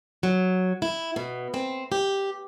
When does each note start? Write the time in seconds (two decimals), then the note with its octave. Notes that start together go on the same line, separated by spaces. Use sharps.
0.23 F#3
0.82 E4
1.16 B2
1.54 C4
1.92 G4